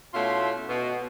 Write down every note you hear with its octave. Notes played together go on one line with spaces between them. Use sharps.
B2 A3 C#4 E4 F4 C6
B2